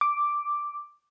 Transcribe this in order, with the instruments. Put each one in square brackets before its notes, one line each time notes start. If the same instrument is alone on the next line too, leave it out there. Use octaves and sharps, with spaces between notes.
[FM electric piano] D6